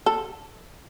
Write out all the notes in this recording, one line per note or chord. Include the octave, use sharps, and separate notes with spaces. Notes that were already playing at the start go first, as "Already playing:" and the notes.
A4